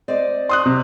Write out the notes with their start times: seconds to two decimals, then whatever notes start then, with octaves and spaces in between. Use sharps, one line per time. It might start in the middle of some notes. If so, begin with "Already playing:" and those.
0.08 C4 D5 D#5
0.49 C6 D#6 F#6
0.66 C3